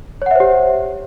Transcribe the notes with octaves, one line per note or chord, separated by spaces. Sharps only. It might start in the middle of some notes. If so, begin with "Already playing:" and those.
G4 C5 C#5 E5 F#5